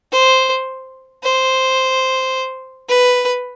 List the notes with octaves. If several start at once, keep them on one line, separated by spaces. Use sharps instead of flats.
C5
C5
B4